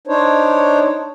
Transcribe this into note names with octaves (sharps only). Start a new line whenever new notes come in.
D4 D#4 C5 C#5